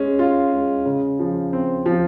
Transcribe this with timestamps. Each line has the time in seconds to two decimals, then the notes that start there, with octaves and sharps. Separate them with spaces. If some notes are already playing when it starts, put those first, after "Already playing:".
Already playing: G#3 C#4
0.19 F4
0.52 G#3
0.85 C#3
1.19 F3
1.53 C4
1.86 F3